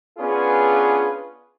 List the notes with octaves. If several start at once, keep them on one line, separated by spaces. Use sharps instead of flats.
B3 C#4 D4 F4 G#4 B4